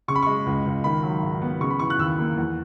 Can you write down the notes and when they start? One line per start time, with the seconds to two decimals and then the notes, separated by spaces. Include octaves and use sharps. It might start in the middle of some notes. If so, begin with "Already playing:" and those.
0.08 C#3 C#6
0.16 B5
0.23 G#3 C#6
0.46 C#2
0.66 C#2
0.84 D#3 B5
1.03 F#3
1.23 G#2
1.42 B3
1.60 C#3 C#6
1.70 B5
1.79 E3 C#6
1.90 F#6
1.99 D#2 E6
2.19 A#3
2.37 E2